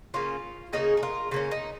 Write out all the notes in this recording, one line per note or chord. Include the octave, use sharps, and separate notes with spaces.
C#3 A#3 C#4 F4
C#3 A#3 C#4 D#4 G#4
G#4
F4 A#4
C#3 A#3 C#4 F4
D#4